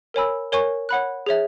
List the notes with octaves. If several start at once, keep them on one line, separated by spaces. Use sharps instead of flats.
A#4 C#5 G#5 B5 E6
A#4 C#5 G#5 C#6
C#5 F#5 B5 F#6
G#4 C#5 E5